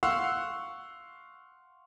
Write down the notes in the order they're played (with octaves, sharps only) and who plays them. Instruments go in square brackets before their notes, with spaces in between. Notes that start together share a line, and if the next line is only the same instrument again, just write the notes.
[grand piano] F5 F#5 C6 C#6 E6 F#6